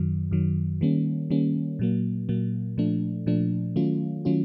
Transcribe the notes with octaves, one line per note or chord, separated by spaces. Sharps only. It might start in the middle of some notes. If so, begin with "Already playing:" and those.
Already playing: F#2 D#3 F#3
F#2 D#3 F#3
D#3 G3 A#3 C#4
D#3 G3 A#3 C#4
A#2 F#3 A#3
A#2 F#3 A#3
A#2 F3 A3 D4
A#2 F3 A3 D4
D#3 F#3 A3 C#4 F4
D#3 F#3 A3 C#4 F4